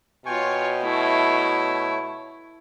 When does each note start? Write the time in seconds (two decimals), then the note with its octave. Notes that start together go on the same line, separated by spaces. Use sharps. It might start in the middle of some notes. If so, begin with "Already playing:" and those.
0.26 B2 F4 C#5 G5 G#5 C#6
0.83 A3 E4 C#5